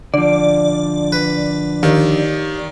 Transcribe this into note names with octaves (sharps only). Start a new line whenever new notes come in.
D3 F3 D5
B4
D#2 D#3